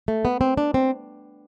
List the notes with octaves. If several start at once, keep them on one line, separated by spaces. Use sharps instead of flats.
A3
B3
C4
D4
C4